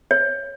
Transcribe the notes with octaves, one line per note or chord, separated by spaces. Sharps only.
C#5